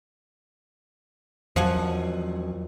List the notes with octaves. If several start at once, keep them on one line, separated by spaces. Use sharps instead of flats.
E2 F3 F#3 F#5 G#5